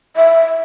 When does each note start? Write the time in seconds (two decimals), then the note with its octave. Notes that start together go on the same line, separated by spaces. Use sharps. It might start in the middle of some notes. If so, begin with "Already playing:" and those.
0.16 E5